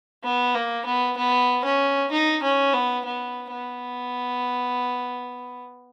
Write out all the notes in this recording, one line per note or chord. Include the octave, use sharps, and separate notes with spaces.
B3
A#3
B3
B3
C#4
D#4
C#4
B3
B3
B3